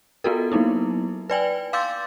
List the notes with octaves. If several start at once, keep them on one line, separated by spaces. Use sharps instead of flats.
B3 F4 F#4 A4 A#4
F#3 A#3 B3 D#4 E4
B4 D5 G5 G#5
F5 C6 D6 E6 G6 A6